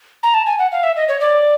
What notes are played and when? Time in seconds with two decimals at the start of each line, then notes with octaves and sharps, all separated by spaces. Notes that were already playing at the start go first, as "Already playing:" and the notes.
0.23 A#5
0.34 A5
0.46 G#5
0.59 F#5
0.72 F5
0.83 E5
0.96 D#5
1.08 C#5
1.20 D5